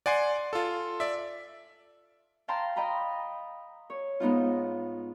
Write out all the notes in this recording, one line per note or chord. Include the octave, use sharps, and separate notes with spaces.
D5 F#5 G#5 C6 C7
F4 A4
D5 E5
F5 G5 A5 A#5 C6
D#5 G5 A#5 B5
C#5
G#2 B3 D#4 F4